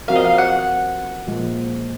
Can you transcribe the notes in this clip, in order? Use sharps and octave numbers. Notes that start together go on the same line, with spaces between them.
F3 C4 F#4 A#4 F5
D#5
F5
F#5
A#2 F3 G#3